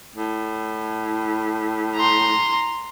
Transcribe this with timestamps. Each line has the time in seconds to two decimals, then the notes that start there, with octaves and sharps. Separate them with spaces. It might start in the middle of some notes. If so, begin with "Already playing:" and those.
0.16 A2
1.96 A#5 C6